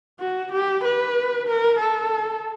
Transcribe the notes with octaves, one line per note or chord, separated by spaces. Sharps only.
F#4
G4
B4
A#4
A4